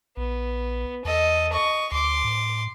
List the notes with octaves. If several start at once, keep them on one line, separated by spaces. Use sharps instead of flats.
A#1 B3
E2 A4 D#5
D#5 C#6
D2 C6 D6
A2